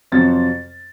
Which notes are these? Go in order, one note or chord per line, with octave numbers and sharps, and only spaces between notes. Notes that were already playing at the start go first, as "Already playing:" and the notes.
F2 C3 F#3 C4 A6